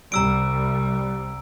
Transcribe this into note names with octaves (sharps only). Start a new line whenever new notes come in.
C2 G3 A#5 E6 D7